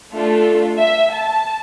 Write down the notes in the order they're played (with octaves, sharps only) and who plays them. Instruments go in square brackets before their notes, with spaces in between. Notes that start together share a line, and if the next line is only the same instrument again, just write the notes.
[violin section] A3 D4 F4 A4
E5
A5